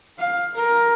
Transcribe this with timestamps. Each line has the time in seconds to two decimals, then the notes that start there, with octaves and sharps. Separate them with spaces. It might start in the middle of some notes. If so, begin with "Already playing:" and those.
0.18 F5
0.55 A#4